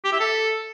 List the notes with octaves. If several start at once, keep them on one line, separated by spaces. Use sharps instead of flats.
G4
E5
A4